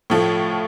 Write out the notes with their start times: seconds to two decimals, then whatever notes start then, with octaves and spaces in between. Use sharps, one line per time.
0.10 A2 F3 A3